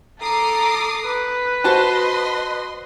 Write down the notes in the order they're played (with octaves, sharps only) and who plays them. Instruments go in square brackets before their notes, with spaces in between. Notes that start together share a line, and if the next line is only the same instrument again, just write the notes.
[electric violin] A4 A#5 [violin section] D6 D#6 C7
[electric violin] B4
[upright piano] F#4 C5 A5 [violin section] D#5 C6